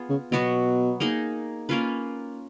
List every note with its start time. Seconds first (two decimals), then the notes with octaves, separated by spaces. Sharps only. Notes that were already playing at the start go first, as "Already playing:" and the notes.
Already playing: B3 F4 G#4
0.10 C#3
0.32 B2 F#3 B3 F#4
1.00 A#3 D#4 G#4 D#5
1.69 A#3 C#4 F4 B4